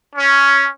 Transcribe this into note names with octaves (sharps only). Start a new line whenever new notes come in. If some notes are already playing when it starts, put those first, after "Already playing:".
C#4